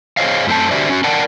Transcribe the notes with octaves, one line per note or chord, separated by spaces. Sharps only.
G#4 C5 C#5 D#5 F5
F#2 A3 C4 C5 A5
D3 F#4 G4 C5 D5 E5
C#4 F#4
A#4 D5 F#5 G5 A5